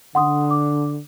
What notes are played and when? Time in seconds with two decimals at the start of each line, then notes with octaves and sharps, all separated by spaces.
0.15 D3 F#5 C6 D#6
0.51 D6